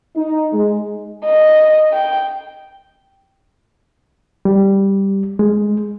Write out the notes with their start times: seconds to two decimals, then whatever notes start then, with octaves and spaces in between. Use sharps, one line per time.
0.15 D#4
0.52 G#3
1.25 D#5
1.93 G5
4.45 G3
5.39 G#3